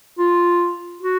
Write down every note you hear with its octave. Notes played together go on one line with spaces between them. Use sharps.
F4
F#4